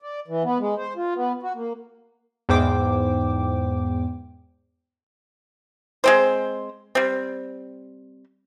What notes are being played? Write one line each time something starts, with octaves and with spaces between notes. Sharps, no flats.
D5
E3
B3
G#3
C5
F4
B3
F#4
A#3
E2 G#2 C5 G5 D6
G#3 C4 C5
G3 C4